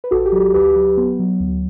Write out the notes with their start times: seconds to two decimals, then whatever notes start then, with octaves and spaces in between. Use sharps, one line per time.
0.04 B4
0.11 A1 F#4 A4
0.25 G4
0.32 F#3
0.40 G4
0.54 D2 G4 B4
0.76 F#3
0.97 B3
1.19 F#3
1.40 D2